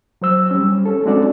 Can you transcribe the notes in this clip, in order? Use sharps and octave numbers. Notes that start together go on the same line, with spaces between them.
F#3 C5 E6
G3 C#4
C#4 A4
G#3 C4 D4 F#4 A4 D5